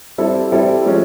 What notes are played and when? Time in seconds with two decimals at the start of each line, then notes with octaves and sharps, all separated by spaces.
0.18 G3 C4 E4 A4
0.52 G3 C4 E4 A4
0.86 F3 G#3 C#4